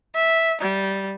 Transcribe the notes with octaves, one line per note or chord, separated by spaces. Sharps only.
E5
G3